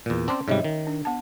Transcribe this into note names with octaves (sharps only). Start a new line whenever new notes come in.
E2 A#2
C4 C#4 D5 C6
G#2 C3 G3 C#5 D#5 E5
D#3
D4
B3 A5